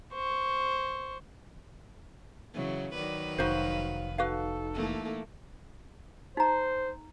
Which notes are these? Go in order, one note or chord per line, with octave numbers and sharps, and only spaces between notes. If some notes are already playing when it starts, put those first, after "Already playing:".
C5 C#6
C#3 E3 F#3
D#3 F#3 B4 D5
F1 D#4 F#4 C5 F5
D#4 F#4 A4 B4 F5
E3 A3 A#3
D#4 C5 A#5